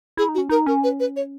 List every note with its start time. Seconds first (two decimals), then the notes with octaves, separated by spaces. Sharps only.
0.17 E4 G#4
0.29 D#4
0.35 F#4
0.38 C#4
0.49 D#4 A#4
0.66 C#4 A#4
0.84 B4
1.00 B4
1.16 C#5